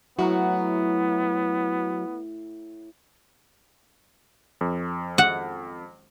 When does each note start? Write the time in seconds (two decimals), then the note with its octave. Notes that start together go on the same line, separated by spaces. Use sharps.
0.19 A2 F#3 B3 E4 F#4 F#5 A#5
4.61 F2
5.18 F#5